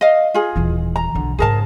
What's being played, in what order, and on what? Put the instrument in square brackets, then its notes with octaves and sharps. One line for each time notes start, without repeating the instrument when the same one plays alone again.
[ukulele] D#5 F5
F4 G#4
[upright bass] D#1 E3
[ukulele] A#5
[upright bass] B1 D3
[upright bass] G#2 C#3 [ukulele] G#4 A#4 A5